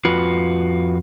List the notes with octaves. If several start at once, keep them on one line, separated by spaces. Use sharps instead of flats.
F2 F4 F#4 B4